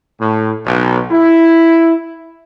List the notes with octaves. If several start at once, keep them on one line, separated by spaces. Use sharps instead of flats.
A2
B1
E4